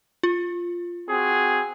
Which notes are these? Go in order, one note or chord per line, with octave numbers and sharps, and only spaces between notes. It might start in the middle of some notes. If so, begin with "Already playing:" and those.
F4
C4 F#4 G#4